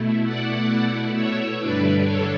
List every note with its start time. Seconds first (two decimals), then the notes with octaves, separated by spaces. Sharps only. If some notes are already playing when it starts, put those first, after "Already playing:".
Already playing: B2 A3 E4
0.25 D5 F#5
0.71 B2 A3 E4
1.15 C#5 E5
1.60 G2 D3 G3 D4 B4 D5
2.04 A4 C#5